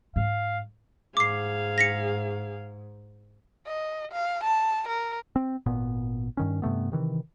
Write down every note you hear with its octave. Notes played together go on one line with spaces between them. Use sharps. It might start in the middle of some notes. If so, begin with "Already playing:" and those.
G#2 F5
G#2 G#4 F5 D6 C7
A#6 B6 C#7
D#5
F5
A5
A#4
C4
G#1 A#2 B3
G2 D#3 C#4
G2 C3 A3 B3
C3 D#3 E3